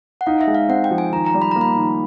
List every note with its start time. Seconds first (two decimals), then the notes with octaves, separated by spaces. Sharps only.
0.21 F#5
0.26 D#4 F5
0.41 E5
0.47 G#3
0.55 F5
0.69 C4 F#5
0.84 G5
0.91 F3
0.98 G#5
1.12 D#3 A#5
1.26 A#5
1.34 G3
1.42 B5
1.51 A#3 A#5
1.61 B5
1.76 D#3